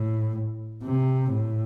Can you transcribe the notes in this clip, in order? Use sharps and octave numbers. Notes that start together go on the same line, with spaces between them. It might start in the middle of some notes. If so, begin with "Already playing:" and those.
Already playing: A2
C3
A2